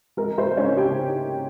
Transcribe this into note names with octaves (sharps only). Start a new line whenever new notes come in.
G#3 A#4
G#3 C5
G#3 C#4 C#5
C#3 G4 G5
D#4